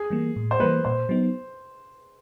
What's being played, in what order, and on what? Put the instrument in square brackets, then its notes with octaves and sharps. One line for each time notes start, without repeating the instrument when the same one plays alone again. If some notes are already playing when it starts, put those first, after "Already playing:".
Already playing: [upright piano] G#4
[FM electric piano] E3 G3 A#3
A2
[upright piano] C5
[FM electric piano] E3 G3 A#3 [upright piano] B4
[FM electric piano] A#2 [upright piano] C5
[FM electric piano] F#3 B3 D#4